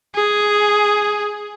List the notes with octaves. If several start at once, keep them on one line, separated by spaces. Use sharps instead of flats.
G#4